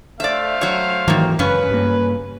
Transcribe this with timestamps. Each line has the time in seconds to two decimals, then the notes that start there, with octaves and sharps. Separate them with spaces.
0.20 A3 C5 D5 E5 F5
0.61 F#3 C#5
1.08 G#2 D#3 E3 F#3 A#3
1.39 F#2 C#3 C#4 B4
1.71 G2 A#3